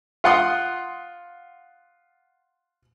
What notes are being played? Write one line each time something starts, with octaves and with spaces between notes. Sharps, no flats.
F4 F#5 C6 D#6